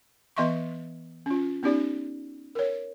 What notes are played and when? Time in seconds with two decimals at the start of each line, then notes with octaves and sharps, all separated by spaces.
0.36 E3 B3 D#5 E5 C6 C#6
1.26 C#4 F4
1.63 B3 C#4 D#4 G4 D5
2.55 A#4 C#5